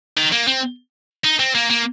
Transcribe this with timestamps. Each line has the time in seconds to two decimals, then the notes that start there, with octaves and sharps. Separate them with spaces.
0.17 D#3
0.32 A#3
0.47 C4
1.25 D#4
1.40 C4
1.55 A#3
1.70 A#3